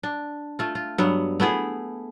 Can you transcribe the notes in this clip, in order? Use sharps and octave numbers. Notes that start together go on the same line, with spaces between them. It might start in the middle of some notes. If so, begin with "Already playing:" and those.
D4
A3 F4
F4
G2 F#3 B3
A3 B3 E4 G#4